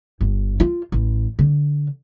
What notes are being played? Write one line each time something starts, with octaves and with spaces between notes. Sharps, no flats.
G1
F4
A1
D3